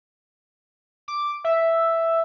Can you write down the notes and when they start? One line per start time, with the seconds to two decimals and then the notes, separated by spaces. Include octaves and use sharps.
1.08 D6
1.44 E5